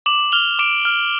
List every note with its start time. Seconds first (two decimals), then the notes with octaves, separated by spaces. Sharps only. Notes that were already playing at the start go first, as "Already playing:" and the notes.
0.06 D6 E7 F#7
0.32 F6 F7 G7
0.59 D6 D7 E7
0.85 F6